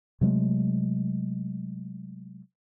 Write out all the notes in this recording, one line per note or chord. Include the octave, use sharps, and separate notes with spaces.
C3 F#3 G#3 A3